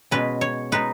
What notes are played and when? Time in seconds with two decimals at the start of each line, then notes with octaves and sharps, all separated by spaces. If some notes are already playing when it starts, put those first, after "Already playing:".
0.11 B2 G#3 C#4 B4
0.41 C#5
0.72 B2 G#3 D#4 B4